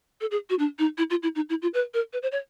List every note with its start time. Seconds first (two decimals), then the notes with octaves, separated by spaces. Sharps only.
0.21 A4
0.31 G#4
0.50 F#4
0.59 D4
0.79 D#4
0.98 E4
1.10 F4
1.23 E4
1.36 D#4
1.49 E4
1.62 F4
1.74 B4
1.94 A#4
2.13 B4
2.22 C5
2.32 C#5